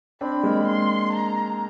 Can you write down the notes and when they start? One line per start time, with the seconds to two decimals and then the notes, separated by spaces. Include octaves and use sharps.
0.21 C4 D4 B5
0.43 G#3 A#3
0.68 C6
1.13 A#5